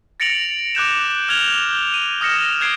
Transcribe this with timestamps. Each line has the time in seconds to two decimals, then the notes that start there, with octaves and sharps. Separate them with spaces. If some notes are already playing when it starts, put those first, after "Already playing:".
0.20 A6 A#6 C#7 D7 F7 F#7
0.75 D6 F#6 G6 E7
1.29 F6 G6 G#6 F7 G7
1.94 D#7
2.21 D#6 F6 A#6 C#7 E7
2.61 F#6 G#6 C7 D7